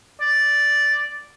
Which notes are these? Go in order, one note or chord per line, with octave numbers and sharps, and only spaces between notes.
D5